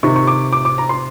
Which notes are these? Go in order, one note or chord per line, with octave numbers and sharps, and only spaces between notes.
C3 D#3 C#6
C#6
D6
D6
D6
A#5
C6